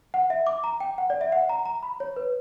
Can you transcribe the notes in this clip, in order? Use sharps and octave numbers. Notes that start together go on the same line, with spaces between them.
F#5
E5
D6
A#5
G5
F#5
D5
E5
F#5
A#5
A#5
B5
C#5
B4